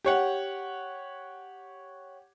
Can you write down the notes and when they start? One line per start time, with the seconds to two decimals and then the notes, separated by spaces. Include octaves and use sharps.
0.05 G4 C#5 F#5